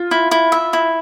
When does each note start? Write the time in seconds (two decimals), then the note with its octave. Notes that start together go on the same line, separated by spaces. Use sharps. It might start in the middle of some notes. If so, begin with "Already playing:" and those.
Already playing: F4
0.11 E4
0.31 E4
0.52 E5
0.73 E4